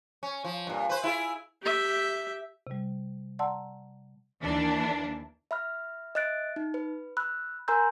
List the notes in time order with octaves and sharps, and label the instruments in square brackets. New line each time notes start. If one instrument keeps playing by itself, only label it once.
[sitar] C#4
F3
G2 A#2
B4 C5
E4 F4 G#4
[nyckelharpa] G4 E5
[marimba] C3 G3
D5 F#5 A5 A#5 C6 E6
[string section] D#2 E3 A#3 D4
[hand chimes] E5 B5 F6
D#5 E5 F#6 A6 D7
D#4
B4
B5 E6 F#6
A#4 G#5 A#5 C6 E6 G6